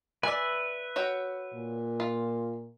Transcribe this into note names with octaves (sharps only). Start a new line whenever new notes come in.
B4 D5 E5 G#5
F#4 C#5 G5
A#2
F4